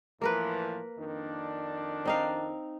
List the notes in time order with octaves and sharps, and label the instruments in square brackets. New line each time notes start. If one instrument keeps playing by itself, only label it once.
[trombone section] A2 E3 F3 [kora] A#3 A#4 B4
[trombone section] F2 D#3 D4
[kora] C4 D#4 F5